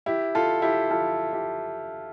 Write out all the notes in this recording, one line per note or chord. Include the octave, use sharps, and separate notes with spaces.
E4 G4
F4 A4
E4 G4
F4 A4
E4 G4